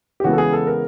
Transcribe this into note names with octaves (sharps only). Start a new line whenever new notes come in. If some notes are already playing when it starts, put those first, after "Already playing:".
G4
C#3 E3 G#3 B3 F#4
A4
G#4
A4
A#4